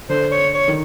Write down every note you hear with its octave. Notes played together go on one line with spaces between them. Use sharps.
D3 C5
C#5
C#5
D#3